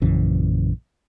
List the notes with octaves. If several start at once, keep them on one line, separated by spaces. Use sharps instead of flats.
A#1 F#2 C#3 E3